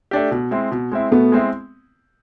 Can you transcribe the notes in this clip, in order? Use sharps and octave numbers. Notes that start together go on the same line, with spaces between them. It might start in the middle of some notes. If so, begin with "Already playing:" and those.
A3 D4 G4
B2
G#3 C4 E4
B2
G#3 C4 E4
B2 A3 B3
G#3 C4 E4